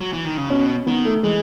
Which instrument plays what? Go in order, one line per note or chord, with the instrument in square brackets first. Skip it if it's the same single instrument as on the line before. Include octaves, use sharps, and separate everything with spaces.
[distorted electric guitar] F#3
E3
D#3
C#3
[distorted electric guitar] B2 [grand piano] C#4
[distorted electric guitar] D#3 [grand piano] B3
[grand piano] A3
[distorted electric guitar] E3 [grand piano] G#3